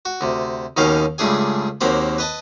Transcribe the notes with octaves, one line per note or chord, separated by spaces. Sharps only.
F#4
D2 C3
D#2 B2 D#3 C#4 F5 D6
C#2 G2 A3 D4 G#4 G#5
D#2 F#3 A#3 C4 B5
B4 D#5 A5